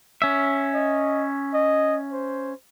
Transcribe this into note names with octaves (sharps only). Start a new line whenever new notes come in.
C#4 E5
D#5
D#5
C5